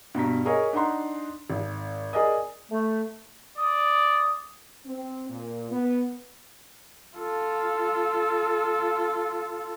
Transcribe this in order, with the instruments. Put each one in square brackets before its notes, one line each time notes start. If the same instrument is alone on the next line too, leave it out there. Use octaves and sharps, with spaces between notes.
[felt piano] G2 B2 A#5 B6
G#4 A#4 C#5 D#5
D4 D#4 F#5 A#5 C6
G#1
G#4 A#4 D5 D#5 G#5 D#6
[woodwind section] A3
[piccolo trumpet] D5 [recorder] D#6
[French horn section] C4
A#2
B3
[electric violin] F4 A4